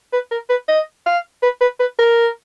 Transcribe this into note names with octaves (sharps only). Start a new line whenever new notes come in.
B4
A#4
B4
D#5
F5
B4
B4
B4
A#4